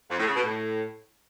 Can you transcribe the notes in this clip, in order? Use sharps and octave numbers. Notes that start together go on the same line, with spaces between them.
F2
A2
C#3
B2
A2